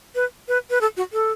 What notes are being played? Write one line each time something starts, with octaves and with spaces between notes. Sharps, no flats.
B4
B4
B4
A4
F#4
A4